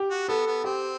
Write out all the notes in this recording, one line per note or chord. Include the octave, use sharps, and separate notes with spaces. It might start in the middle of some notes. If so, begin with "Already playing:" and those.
Already playing: G4
F#4
B3 A4
B3
C4 G4